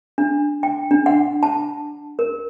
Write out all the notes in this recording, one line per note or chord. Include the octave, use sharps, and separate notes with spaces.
D4
G5
D4
F#5
A5
A#4